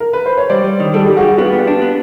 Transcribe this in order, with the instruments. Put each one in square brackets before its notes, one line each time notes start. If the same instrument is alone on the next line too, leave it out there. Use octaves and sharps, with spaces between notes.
[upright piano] A#4
B4
C5
C#5
[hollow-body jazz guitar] G3 [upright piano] C5 D5
[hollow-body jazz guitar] G3
D#3
[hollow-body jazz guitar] G3 [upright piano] A4
[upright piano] G#4
[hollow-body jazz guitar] G3 [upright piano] G4
[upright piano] F#4 G#4
[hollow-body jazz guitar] G3
[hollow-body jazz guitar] B3 [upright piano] F4 G4
[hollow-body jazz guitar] B3
D4
B3